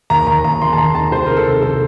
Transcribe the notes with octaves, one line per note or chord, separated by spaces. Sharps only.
D#2 A#5
D#2 A#5
D#2 A#5
D#2 C6
A5
D#2 A#5
D#3 A5
C2 C5
D#3 A#4
A4
C3
C2 A4